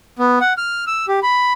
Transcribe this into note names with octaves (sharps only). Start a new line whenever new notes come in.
B3
F#5
F6
E6
G4
B5